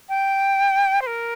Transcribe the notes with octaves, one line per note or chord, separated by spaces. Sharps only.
G5
C5
A#4